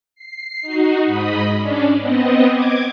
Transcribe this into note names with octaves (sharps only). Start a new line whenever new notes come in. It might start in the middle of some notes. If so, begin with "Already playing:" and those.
C7
D#4 F#4
G#2 D#5 B5
C#4 D4 D5
B3 C4 D#5
D6 G#6